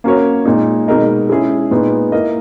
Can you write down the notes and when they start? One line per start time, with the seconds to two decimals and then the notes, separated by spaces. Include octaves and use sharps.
0.04 A#3 C#4 F#4 A#4 C#5
0.45 A#2 G#3 D#4
0.88 B2 G#3 D#4 A#4 D#5
1.29 G#3 C#4 E4 G#4
1.71 A#2 G#3 B3 D#4
2.12 A#3 E4 A#4 D#5